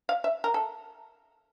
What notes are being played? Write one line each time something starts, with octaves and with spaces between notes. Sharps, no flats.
F5
E5
A#4
A4